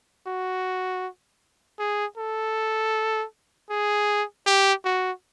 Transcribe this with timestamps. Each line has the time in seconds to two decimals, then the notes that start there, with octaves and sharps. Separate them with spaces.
0.27 F#4
1.79 G#4
2.18 A4
3.70 G#4
4.46 G4
4.85 F#4